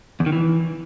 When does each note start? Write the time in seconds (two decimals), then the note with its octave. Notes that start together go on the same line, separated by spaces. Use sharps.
0.20 E2
0.26 D#3
0.32 E3